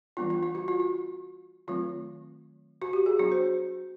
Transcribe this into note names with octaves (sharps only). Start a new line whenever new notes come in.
E3 G3 B3 D4 F4
F4
F4
F#4
F4
F4
D#3 F#3 A3 C4 F4
F#4
G4
G#4
F#3 B3 D4 F#4
C5